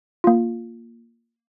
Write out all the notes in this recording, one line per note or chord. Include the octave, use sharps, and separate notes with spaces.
A#3 F4